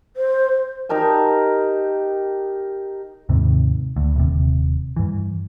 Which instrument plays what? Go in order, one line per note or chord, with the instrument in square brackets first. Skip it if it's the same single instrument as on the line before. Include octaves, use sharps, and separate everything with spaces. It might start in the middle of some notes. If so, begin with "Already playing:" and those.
[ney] C5
[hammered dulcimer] D#4 G4 A#4 A5
[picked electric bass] D#2 G#2 C3 D#3
D2
D#1 C3
G2 E3